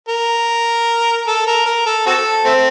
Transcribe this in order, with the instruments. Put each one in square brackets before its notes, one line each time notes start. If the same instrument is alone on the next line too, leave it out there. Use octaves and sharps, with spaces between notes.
[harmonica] A#4
A4
A#4
A#4
A4
C4 F#4 A4
A3 C4